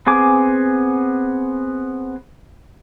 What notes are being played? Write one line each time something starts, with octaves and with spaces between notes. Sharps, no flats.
B3 C4 G#4 G#5 D6